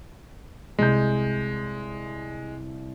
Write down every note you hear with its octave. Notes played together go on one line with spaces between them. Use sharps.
C2 G#3 G6